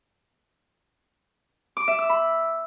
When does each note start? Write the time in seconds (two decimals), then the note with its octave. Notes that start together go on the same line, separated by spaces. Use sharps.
1.77 D6
1.88 E5
1.99 E6
2.09 B5